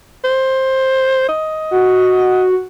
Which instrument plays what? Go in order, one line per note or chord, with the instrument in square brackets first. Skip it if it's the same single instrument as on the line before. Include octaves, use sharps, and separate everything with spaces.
[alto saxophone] C5
D#5
[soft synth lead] F#4